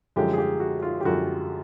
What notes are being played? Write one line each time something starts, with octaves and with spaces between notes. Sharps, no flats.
F#2 D3 F3 G#3 G4
G#4
G4
F#4
F4
G4
F#2 D3 F3 G#3 F#4